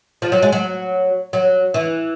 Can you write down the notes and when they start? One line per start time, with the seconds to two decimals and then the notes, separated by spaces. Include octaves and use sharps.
0.22 F3
0.32 F#3
0.42 G#3
0.52 F#3
1.33 F#3
1.74 E3